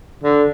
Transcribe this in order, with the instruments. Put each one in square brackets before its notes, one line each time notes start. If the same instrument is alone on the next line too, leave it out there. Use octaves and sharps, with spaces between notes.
[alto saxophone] D3